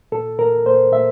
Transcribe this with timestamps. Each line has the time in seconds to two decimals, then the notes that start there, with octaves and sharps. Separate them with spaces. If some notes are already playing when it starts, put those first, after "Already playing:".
0.12 A#2 A4
0.39 A#2 A#4
0.66 A#2 C5
0.92 A#2 E5